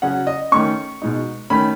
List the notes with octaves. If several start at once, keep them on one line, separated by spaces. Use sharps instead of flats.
C#3 F#3 C#4 F#5
D#5
D#3 A3 C#4 C#6
B2 G#3 D#4
D#3 A3 C#4 B5